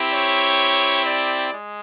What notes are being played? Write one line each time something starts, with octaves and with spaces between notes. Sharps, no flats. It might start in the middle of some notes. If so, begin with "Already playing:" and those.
Already playing: C4 E4 G4
C#5
D5
G#3